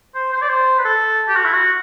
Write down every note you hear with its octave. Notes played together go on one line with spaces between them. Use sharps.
C5
C5
D5
C5
B4
A4
G4
F#4
E4
F#4